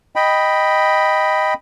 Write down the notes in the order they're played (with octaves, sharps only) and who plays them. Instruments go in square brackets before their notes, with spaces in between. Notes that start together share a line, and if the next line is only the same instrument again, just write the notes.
[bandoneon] D#5 G5 B5